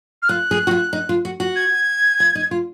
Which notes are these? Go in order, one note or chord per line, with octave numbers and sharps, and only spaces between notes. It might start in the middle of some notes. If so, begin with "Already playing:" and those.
F6
F4 F#6
G#4
F#4
F4
D#4
F4
F#4
F#4
G#6
F4
D#4
F4